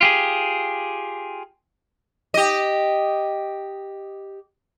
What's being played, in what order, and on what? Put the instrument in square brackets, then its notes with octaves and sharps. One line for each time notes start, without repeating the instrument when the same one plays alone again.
[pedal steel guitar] F4 G4 G#4
[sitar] G4 D#5